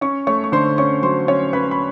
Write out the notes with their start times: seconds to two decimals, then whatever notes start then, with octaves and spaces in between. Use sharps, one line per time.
0.01 C#4 C#5 C#6
0.27 A3 C#5 C#6
0.44 C#6
0.52 D3 C5 C6
0.78 C#4 C#5 C#6
1.02 F#3 C5 C6
1.28 C#4 C#5 C#6
1.53 C#4 B4 B5
1.71 B5